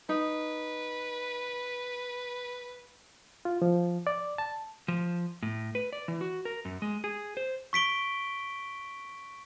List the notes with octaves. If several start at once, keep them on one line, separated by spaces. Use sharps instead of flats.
D#4 B4
F4
F3
D5
A5
F3
A2
B4
D5
E3
F#4
A#4
F#2
G#3
G#4
C5
C#6 B6 D7 G7